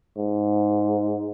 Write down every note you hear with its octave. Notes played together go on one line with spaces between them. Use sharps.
G#2